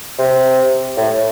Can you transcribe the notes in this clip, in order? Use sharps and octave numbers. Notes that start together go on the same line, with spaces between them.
C3
A2